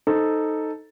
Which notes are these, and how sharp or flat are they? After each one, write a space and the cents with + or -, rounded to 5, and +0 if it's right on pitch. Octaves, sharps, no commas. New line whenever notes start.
D#4 +0 A4 +0 C5 +0